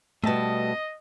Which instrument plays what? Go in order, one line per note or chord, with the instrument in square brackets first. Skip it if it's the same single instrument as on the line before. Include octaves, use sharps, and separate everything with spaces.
[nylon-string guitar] B2 G3 [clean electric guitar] A3 A5 [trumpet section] D#5